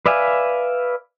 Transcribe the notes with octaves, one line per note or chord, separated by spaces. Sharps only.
B4 D5 E5 F5 G#5